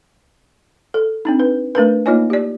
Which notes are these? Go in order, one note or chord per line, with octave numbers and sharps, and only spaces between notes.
A4
C4 D4 D#4
B4
A3 D4 A#4 B4
A#3 D#4 F4 C#5 D#5 G#5
G4 D5